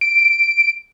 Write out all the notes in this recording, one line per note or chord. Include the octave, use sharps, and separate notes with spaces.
D7